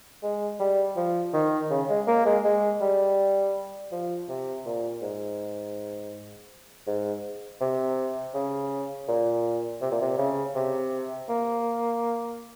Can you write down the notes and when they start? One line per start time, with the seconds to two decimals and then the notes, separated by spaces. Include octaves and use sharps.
0.23 G#3
0.60 G3
0.96 F3
1.33 D#3
1.70 C#3
1.89 G#3
2.08 A#3
2.26 G#3
2.44 G#3
2.81 G3
3.92 F3
4.29 C3
4.66 A#2
5.02 G#2
6.87 G#2
7.61 C3
8.34 C#3
9.08 A#2
9.82 C3
9.92 A#2
10.01 C3
10.18 C#3
10.56 C3
11.29 A#3